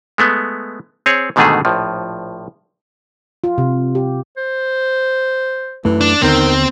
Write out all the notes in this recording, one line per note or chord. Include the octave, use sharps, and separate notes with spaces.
G#3 A3 B3
C4 G#4 C#5
G#2 B2 D3 D#3 A3 G#4
A#1 A2 F3
F4
C3
G4
C5
F#2 E3 A3
D4
D#2 D3 D#3 B3 C4